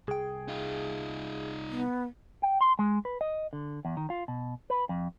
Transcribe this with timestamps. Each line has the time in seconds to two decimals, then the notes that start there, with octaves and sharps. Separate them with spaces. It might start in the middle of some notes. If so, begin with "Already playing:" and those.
0.08 C2 G#4 G5
0.48 D#4 F4
1.70 B3
2.42 G5
2.61 C6
2.79 G#3
3.05 B4
3.21 D#5
3.53 D3
3.85 E2
3.97 D#3
4.10 F4
4.28 B2
4.70 B4
4.89 F2